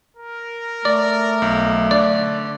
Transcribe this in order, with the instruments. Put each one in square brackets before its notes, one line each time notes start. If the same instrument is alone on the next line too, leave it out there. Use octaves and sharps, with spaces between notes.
[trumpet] A#4
[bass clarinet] A3 [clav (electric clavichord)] D5
[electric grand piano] B1
[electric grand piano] D3 [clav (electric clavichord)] D5